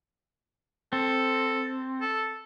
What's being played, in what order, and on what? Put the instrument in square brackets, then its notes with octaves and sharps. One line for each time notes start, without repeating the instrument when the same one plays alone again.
[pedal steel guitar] C4 [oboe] A4
[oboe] A4